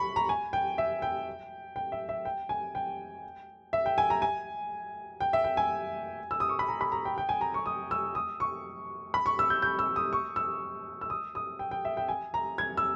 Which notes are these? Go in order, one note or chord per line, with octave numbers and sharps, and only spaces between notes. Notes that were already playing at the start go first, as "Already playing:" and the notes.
Already playing: B5 C#6
A#5
G#5
G5
E5
G5
G5
E5
E5
G5
G#5
G5
E5
G5
G#5
A#5
G#5
G5
E5
G5
G#5
E6
D#6
C#6
B5
A#5
B5
A#5
G5
G5
G#5
A#5
C#6
D#6
E6
D#6
C#6
B5
C#6
E6
G6
G6
E6
D#6
C#6
E6
E6
D#6
D#6
G5
G5
E5
G5
G#5
A#5
G#6
E6